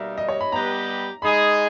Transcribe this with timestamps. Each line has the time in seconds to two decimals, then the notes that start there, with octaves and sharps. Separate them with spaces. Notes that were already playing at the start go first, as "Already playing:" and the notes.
Already playing: B2 G3 A#3 D#4 A#4 E5
0.18 D#5
0.28 C#5
0.40 B5
0.52 G3 B3 G4 B4 D#5 A#5
1.22 G#3 D#4 G#4 D#5 B5